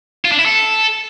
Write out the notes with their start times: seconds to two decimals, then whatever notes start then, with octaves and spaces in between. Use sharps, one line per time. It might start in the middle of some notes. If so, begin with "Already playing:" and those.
0.25 F4
0.32 D4
0.39 E4
0.46 A4